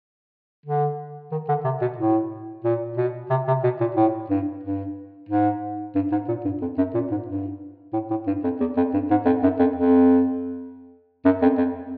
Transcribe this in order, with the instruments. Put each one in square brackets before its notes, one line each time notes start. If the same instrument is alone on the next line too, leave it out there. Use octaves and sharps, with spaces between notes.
[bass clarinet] D3
D#3
D3
C3
B2
A2
A#2
B2
C3
C3
B2
A#2
A2
G2
G2
G#2
G2
G#2
A#2
G2
F2
F#2
A#2
G#2
G2
A2
A2
G2
F2
E2
F2
G2
G#2
F2
F#2
F2
F2
F#2
F2
F2